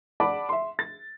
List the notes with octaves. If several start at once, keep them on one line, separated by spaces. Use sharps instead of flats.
D5 F#5 A5 B5 D6
E5 C6
A6